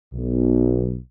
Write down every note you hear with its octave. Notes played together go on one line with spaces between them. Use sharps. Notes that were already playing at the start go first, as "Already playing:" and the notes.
B1